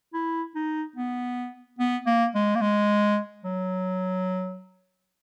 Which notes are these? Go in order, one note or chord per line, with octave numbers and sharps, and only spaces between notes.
E4
D#4
B3
B3
A#3
G#3
A#3
G#3
F#3